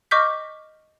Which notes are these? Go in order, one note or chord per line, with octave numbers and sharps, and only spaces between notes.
D#5 C#6 D6 F6 G6 B6